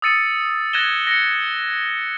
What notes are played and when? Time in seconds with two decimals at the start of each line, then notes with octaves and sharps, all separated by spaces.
0.02 D#6 E6 A6 C#7 D#7
0.73 F#6 G#6 A#6 D#7 E7 G7
1.07 A#6 C#7